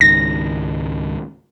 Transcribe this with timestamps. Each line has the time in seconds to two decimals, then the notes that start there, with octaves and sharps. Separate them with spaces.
0.01 C#2 G#2 D#3 A#6